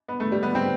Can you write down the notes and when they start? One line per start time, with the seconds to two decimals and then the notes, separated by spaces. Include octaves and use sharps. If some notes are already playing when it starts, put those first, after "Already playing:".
0.08 B3
0.20 A3
0.32 G3
0.43 B3
0.55 C4